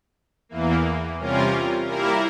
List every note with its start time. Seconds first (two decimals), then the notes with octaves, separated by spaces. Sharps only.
0.49 E2 E3 A#3
1.19 C3 G3 C#4 F4 A#4
1.87 G3 A#3 E4 A#4